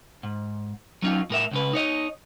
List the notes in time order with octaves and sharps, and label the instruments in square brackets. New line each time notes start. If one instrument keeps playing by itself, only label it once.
[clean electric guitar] G#2
F#3 C#4 D#4 F4
A2 A#4 E5
C#2 C#3 B4
D#4 C#5 D#5